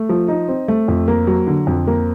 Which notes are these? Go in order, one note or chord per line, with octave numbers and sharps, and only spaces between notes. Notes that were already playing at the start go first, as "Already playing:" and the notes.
Already playing: A3
F3
D#4
C4
A3
F2
A#3
F#3
D3
F2
A#3